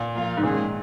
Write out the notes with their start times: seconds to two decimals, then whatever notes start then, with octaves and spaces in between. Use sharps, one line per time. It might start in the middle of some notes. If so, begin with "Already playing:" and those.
Already playing: A#2
0.15 F3 A#3 F4
0.37 G#2
0.43 A#2 D#3 G#3 C#4 G#4